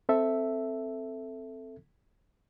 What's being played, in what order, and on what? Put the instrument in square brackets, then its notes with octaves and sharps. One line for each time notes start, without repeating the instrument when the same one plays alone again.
[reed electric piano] C4 A4 E5